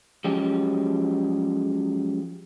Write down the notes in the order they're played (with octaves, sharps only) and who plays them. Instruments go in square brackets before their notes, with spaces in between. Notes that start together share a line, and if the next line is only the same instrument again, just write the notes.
[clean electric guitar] F3 F#3 G#3 C#4 G4